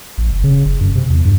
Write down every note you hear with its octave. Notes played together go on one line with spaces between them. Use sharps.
A1
F#1
C#3
F#1
F#2
C3
E2
G2